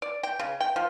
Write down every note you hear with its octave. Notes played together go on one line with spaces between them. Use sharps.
D5
G5
C#3
G5
F3